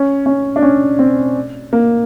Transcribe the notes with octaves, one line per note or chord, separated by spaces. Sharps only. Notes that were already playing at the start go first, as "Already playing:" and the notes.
Already playing: C#4
C#4
D4
C#4
C4
A#3